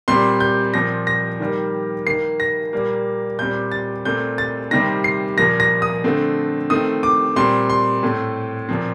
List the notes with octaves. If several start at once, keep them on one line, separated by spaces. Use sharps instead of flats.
A#2 G3 C4 C6
G6
A#2 F3 C4 A#6
A#6
D#3 G3 A#3
D#3 A#3 C7
A#6
A#2 G3 A#3
A#2 G3 C4 G6
A6
A#2 A3 C4 G6
A6
C3 D#3 G3 C4 A#6
C7
A#2 F3 A#3 A#6
A#6
D#6
D3 A3 C4
D#3 A3 C4 D#6
D6
A#2 G3 C4 C6
C6
A2 A3 C4
A#2 F3 C4